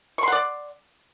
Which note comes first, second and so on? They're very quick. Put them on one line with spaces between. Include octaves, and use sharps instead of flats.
C#6 C6 F#5 D5